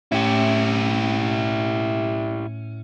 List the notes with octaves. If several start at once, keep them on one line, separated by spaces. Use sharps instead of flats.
A2 C#4 E4 G4